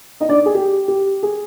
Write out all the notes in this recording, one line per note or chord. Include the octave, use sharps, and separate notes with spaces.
D#4 D#5
D4 D5
G#4
G4
G4
G#4